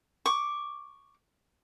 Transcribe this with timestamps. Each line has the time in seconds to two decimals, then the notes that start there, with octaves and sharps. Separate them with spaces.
0.26 C#6 D6